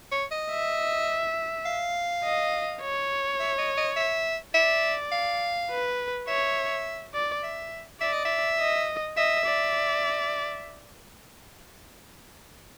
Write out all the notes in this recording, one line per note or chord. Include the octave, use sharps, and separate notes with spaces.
C#5
D#5
E5
F5
D#5
C#5
E5
D#5
D#5
E5
D5 E5
F5
B4
C#5 E5
D5
E5
D5 E5
D#5
E5
D#5
D#5 E5
D5